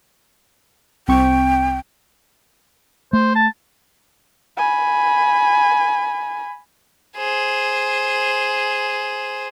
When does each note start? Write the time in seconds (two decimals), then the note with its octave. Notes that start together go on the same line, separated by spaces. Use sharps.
1.08 C2 C4 G5 C#6
3.13 A3 C5
3.36 A5
4.57 G#5 B5
7.17 G#4 C5